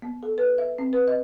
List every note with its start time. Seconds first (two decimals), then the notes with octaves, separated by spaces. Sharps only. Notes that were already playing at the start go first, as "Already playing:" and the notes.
0.02 B3
0.23 A4
0.38 B4
0.58 E5
0.78 C4
0.93 B4
1.08 D#5